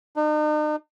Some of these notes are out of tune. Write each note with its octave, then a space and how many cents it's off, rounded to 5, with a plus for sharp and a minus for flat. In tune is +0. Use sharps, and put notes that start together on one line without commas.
D#4 -45